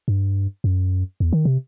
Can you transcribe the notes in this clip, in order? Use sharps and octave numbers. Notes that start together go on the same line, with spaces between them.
G2
F#2
E2
D#3
C3